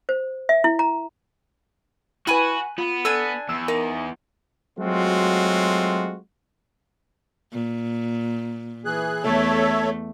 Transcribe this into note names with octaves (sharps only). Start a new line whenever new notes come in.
C5
E5
E4
A#5
E4 F#4 B4 G#5 B5 F#6
B3 F4
D4 A4 G#5 E6
E2 E6
D#4 A#4
F#3 G#3 A3 C4 F4 F#4
A#2
E3 G#4 F#6
E2 A3 A4 C#5 E5